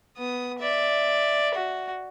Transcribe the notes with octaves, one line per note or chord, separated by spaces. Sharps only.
B3 D#6
D5 E5
F#4